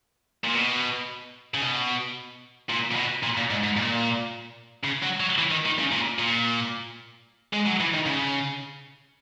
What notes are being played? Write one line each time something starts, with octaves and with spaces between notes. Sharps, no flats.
A#2
B2
C#3
B2
A#2
A#2
B2
A#2
A#2
G#2
G#2
A#2
C#3
F#3
F#3
E3
D#3
D#3
C#3
A#2
A#2
G#3
F#3
E3
D#3
C#3